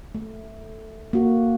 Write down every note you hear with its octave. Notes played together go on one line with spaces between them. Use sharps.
A3
A#3 F#4